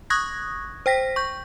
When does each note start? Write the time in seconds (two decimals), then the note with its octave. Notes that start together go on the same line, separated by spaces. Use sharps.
0.10 C#6 D#6 F#6 G#6 A#6
0.86 C5 G5 A#6 B6
1.16 C#6 G6